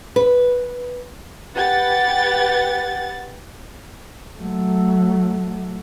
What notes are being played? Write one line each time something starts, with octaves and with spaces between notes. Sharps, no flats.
B4
G4 B4 F#5 A6
F#3 A3